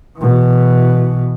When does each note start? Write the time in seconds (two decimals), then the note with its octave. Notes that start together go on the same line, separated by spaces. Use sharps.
0.18 B2 E3